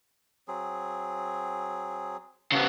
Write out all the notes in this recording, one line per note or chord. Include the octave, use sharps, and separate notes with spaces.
F#3 C4 G#4
C#3 B3